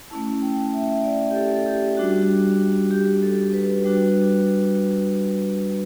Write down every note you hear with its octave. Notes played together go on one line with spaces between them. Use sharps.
A3 C#4 E4 A5
G5
E5
D5
G4
A4
A4
G4
G3 D4 F#4
G4
A4
B4
G3 D4 F#4